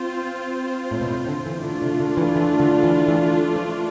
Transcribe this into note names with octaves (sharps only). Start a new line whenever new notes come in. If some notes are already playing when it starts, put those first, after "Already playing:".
Already playing: C4 F4 C5
A2
B2
A2
D3
E3
D3 A3 D4 F4
C3
D3
E3
E3
D3
E3
E3
F3